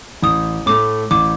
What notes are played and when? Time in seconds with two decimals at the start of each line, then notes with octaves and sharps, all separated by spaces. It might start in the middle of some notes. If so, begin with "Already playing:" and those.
0.22 A1 D#6
0.66 A2 A3 D6
1.11 A1 D6